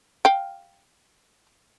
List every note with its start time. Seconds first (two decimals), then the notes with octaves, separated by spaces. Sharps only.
0.25 F5 G5